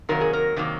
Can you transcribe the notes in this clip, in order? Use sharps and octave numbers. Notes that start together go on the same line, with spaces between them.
C3 D#3 F#3 A#3 A#4
G#4
A#4
C3 D#3 F#3 A#3